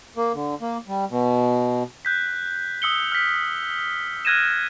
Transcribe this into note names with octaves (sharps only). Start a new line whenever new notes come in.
A#3
D3
A#3
G3
B2
F#6 G6 B6
D#6 E6 C#7 G7
F6 B6
F6 F#6 G#6 A#6 D#7 E7